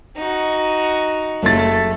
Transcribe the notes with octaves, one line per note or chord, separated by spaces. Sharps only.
D#4 F#4
F#1 A3 A6